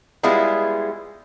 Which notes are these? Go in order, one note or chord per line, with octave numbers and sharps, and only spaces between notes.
G3 G#3 B3 E4 F4 G#4